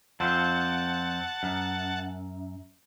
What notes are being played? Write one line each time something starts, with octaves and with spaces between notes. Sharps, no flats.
F2 C4 F#5 A5
F#2